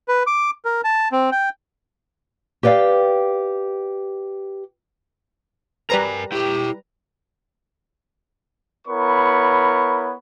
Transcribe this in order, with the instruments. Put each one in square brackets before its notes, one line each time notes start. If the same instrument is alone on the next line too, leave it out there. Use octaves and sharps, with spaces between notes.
[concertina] B4
D6
A#4
A5
C4
G5
[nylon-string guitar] G4 B4 D5 D#5 F5 G5
[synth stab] G3 B4 A#5 [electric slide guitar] A#4 G#5
[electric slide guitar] E4 G5 [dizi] G4
[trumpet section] B3 E4 A#4 C#5 B5 C#6